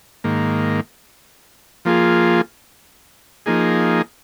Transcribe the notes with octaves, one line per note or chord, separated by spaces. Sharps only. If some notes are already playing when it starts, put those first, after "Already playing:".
G#2 D#3 A#3
F3 A#3 F4 G#4
F3 A#3 D#4 G#4